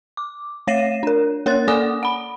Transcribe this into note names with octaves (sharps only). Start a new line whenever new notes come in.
D6
A3 C#5 A#6 C7 D#7 E7
D4 A#4
A#3 A#4 C#5 C6 F#6 A6
A#3 A4 D5 G#5 D6 D#6
F#5 B5